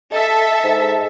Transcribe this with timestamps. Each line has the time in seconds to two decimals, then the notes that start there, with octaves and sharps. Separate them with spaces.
0.12 A4 D#5 E5 A5 E6
0.64 G#2